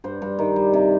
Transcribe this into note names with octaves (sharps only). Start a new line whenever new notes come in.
G2 C5
G2
D#3
G3
C3